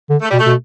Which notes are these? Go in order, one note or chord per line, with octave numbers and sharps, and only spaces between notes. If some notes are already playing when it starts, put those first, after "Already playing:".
D3
A3
B2 G3
A3
B2